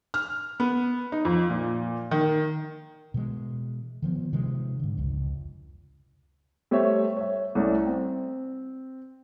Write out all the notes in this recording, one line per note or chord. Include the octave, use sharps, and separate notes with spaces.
F6
B3
D#4
F2
A#2
D#3
B2 E3 G#3
D#3 F3 A3 B3
C3 D#3 F3 G#3
G#2 D3
F1 C#2
G3 A3 C5 C#5 E5
C#5 E5
C2 A3 C#4 D5
C4